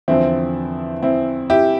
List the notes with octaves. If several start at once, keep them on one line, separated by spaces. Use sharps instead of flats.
E2 D3 F3 C4 E4
C4 E4
E4 G4